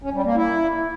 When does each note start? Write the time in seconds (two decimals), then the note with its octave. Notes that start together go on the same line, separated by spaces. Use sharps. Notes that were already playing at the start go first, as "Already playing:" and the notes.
0.02 C#4
0.13 G3
0.25 A#3
0.36 E4